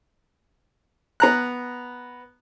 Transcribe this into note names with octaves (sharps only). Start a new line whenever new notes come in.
B3 A#5 F#6